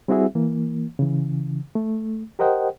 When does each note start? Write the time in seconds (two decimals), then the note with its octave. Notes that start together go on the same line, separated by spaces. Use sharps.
0.08 G3 C4 E4 F#4 G#4 E5
0.35 E3 A#3
0.99 C#3 E3
1.75 A3
2.39 G4 A#4 C5 D#5 F#5 G5